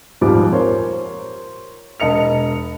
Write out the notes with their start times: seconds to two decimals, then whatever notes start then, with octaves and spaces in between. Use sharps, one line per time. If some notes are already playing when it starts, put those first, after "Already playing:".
0.21 D#1 F2 G#2 F3 G3 D6
0.52 A#4 C5 C#5
2.00 E1 D#5 C#7 F7